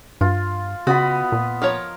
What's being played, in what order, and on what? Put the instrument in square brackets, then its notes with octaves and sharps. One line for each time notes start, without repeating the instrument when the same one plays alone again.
[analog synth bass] G2 [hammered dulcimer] F4
[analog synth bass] C#3 [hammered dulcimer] B3 D#5 B5 [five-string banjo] F#4
[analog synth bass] A#2
[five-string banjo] F3 F4 C#5 [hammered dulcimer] A#4